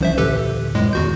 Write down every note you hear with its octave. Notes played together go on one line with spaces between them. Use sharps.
C2 E3 F3 C#4 C5 E5
D#2 A#2 D3 G4 A4 B4
F2 A2 G#3
E2 D#3 F#4 G6